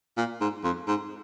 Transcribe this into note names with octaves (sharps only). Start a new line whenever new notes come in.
A#2
G#2
F2
G#2